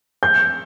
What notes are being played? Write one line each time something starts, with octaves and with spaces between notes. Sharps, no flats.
G6